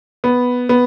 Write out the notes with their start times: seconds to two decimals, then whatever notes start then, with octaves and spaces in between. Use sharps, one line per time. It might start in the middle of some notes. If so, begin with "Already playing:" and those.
0.24 B3
0.69 B3